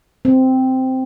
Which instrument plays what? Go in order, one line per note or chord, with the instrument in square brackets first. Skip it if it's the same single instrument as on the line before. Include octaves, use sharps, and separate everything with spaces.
[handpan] C4